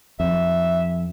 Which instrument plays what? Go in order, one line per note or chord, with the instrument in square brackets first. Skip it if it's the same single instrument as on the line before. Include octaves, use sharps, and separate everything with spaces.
[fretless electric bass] F2 [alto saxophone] E5